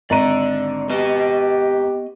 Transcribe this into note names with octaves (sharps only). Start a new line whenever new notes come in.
G#1 D3 D5 A#5 D#7
B3 G4 B4 D#5